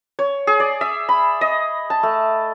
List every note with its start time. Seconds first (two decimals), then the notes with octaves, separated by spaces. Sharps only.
0.19 C#5
0.47 G#4
0.60 D5
0.81 E5
1.09 B5
1.41 D#5
1.90 A5
2.03 A3